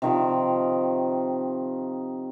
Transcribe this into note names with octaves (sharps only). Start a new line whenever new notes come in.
C3 D#3 F3